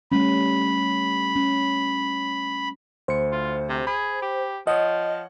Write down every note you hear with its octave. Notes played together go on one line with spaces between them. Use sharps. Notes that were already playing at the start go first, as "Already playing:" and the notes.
G3 A3 C#4 B5
C#4
D2 C5 C#7
F4
C3
G#4 B5
G4
F3 C#5 D#5 F#5